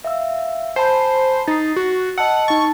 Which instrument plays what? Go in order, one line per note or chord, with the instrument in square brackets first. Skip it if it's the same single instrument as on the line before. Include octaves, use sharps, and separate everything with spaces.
[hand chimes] E5 F5 E6
[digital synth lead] C5 [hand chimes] G#5 A5 B5
[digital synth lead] D#4 [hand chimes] A6 C7
[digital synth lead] F#4
[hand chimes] D#5 A5 E6 [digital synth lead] F#5
[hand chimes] D#4 A5 A6 [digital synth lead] C#6